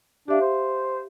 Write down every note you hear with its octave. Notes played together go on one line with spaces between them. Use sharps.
D4 G4 E5 F5
C5